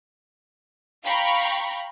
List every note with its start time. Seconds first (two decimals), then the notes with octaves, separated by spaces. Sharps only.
1.05 F5 G5 A#5 B5 C#6